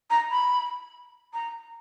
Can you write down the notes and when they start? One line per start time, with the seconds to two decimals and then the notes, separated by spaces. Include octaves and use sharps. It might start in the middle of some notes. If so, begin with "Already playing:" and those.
0.10 A#5
0.31 B5
1.34 A#5